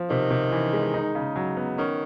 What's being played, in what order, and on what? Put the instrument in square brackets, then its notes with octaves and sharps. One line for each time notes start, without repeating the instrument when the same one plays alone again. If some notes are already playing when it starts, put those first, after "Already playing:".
Already playing: [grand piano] F3
[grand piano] C3 [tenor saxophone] D#3
[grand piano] C3
E3
G#3
D#4
C#3
F#3
B3
[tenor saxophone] D#3 [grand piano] C#4